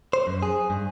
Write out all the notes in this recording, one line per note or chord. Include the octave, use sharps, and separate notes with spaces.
C5
F#2
G#4
G2